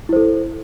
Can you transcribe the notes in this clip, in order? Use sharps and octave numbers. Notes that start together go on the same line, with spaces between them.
E4 A4 C5